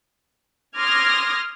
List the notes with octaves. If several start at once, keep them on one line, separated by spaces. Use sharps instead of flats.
C6 D6 D#6 F6 G#6 A#6